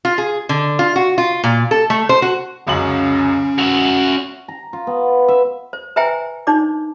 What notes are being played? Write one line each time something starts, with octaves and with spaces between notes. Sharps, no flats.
F4
G#4
D3
F4
F#4
F4
A#2
A4
A3
C5
F#4
C#2 F#2 C#4 F5 F#7
F#4 E5 F7
A#5
F4
B3
E5
C5
B4 C5 E5 G5 G#5 A#5
D4 D#4 C5 D5 D6